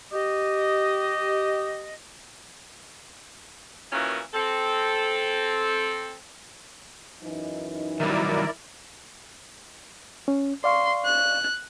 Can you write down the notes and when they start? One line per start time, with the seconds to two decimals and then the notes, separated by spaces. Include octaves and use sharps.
0.13 G4 D#5
3.92 A#2 D#3 E3 A#3 C#4 F#4
4.34 C4 A4
7.23 F#2 E3 D#4
8.00 D#3 F#3 G3 E4 A#4 D5
10.28 C#4
10.64 D5 F5 C6 C#6
11.04 F#6